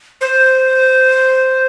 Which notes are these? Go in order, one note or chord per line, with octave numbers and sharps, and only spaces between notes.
C5